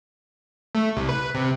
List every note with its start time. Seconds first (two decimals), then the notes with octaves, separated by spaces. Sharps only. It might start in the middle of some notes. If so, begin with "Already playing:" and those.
0.75 A3
0.97 C2
1.09 B4
1.35 C3